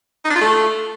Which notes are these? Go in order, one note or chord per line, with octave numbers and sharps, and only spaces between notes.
D#4
D4
F4
A3